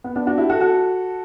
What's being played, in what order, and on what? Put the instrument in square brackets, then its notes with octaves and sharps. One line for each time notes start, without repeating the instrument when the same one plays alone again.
[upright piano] B3
B3 D4
D4 F#4
E4 G4
F#4 A4
F#4 A4